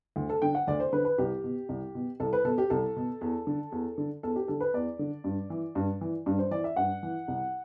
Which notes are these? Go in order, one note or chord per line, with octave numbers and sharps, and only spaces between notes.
D2
A4
D3 G5
F#5
D2 D5
C5
D3 B4
B4
C2 G4
B2
C2
B2
C2 A4
B4
B2 A4
G4
C2 A4
B2
E2
D3
E2
D3
E2 A4
G4
D3 A4
B4
E2 D5
D3
G2
E3
G2
E3
G2
C5
E3 D5
E5
G2 F#5
E3
C2